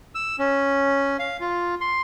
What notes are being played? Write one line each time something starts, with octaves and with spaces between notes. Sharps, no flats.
E6
C#4
F5
F4
C6